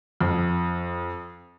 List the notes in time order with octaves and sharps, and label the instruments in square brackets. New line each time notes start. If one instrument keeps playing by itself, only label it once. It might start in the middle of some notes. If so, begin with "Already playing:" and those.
[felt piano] F2